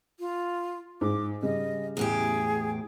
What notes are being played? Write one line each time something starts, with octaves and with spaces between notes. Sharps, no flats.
F4
G#2 D6
C#3 G3 D#5
E2 A2 G4 G#4